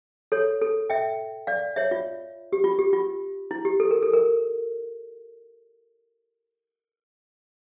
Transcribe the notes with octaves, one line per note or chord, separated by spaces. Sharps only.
A4 C#5
A4
E5 G5
D5 F5
C#5 E5
F4
G4
F4
G4
F4
E4
G4
A4
A#4
A4
A#4